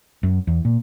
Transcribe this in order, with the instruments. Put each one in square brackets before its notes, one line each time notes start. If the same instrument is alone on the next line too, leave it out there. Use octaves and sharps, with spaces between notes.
[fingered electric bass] F#2
E2
A#2